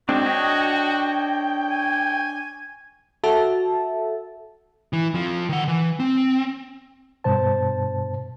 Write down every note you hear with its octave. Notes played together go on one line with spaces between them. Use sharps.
G#3 C4 D4 F#4 G5
D4 C#5 D#5
G#5
F#4 A4 E5 A5
E3
F2 F3
D#3 F#5
E3
C4
G2 B2 C5 A5